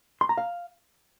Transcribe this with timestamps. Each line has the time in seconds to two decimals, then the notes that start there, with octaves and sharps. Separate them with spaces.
0.21 C6
0.29 A#5
0.37 F5